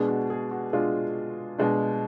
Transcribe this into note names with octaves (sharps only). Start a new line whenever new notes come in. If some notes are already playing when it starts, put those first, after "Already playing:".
Already playing: B2 G#3 D4 G#4
F#4
G#4
F#4
B2 G#3 D4 F4
B2 G#3 D4